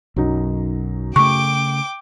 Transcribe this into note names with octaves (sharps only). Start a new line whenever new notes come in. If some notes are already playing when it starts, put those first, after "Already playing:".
B1 F#2 F#3 D#4
C#3 A3 G5 C#6 D6